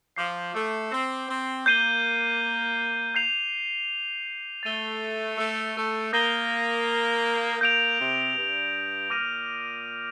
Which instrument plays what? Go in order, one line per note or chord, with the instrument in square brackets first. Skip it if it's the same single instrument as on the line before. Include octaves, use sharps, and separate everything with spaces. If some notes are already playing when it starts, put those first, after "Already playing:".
[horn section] F3 [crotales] D6 G6 C7
[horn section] A3
C4
C4
[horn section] A#3 [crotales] G6 C7 D#7 G7
[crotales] G6 C7 F7
[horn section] A3 [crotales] A6 D#7 G7
[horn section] A3
A3
[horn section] A#3 [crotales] D#6 G6 A#6 D#7 G7
[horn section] A#3 [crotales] G6 D7 F7
[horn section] C3
G2
[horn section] A#2 [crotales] D6 F6 A#6 D#7